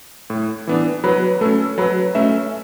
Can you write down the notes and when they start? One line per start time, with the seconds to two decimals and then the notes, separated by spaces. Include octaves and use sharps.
0.30 A2
0.67 E3 B3 D4
1.04 F#3 B4
1.41 A3 C#4 A4
1.78 F#3 B4
2.15 A3 C#4 E5